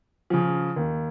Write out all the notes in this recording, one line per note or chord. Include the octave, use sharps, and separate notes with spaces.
C#3 F3
D#2